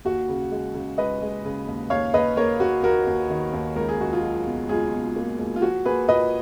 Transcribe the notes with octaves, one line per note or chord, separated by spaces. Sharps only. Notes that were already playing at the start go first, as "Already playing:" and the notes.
D#2 F#4
C#3
G#3
C#3
G#3 B4 D#5
G#3
C#3
D#2
D#2 C#5 F5
D#2 B4 D#5
A#3 A#4 C#5
A#3 F#4
D#2 F#4 A#4
D#2
D#3
D#2
C#2 A#4
G#4
C#2 F#4
F4 G#4
F#3
B2
C#2 F4 G#4
B2
A#3
C#2
F4
F3 F#4
A#3 G#4 B4
A#2 B4 D#5